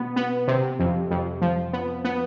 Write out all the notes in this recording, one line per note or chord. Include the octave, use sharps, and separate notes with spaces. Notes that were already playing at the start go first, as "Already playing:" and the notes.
Already playing: B2 B3
B3
C3
F2
F2
F3
B3
B3